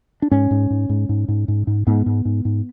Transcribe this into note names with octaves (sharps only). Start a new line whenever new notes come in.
D4
G#2 C#4
G#2
G#2
G#2
G#2
G#2
G#2
G#2
G#2 B3
G#2
G#2
G#2